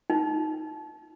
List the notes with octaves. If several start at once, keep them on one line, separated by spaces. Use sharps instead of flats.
D#4